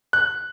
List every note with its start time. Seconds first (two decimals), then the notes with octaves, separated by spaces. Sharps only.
0.13 F#6